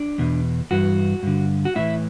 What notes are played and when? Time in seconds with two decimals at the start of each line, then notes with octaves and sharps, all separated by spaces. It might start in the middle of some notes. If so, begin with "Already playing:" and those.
Already playing: D4
0.18 E2 B2
0.71 G2 E3 F#4
1.23 G2 D3
1.65 F#4
1.75 A2 E3 E4